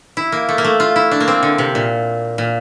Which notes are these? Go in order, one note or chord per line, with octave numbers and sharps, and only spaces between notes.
E4
A#3
A3
A#3
A3
F4
E4
D4
A#3
C4
D3
C3
A#2
A#2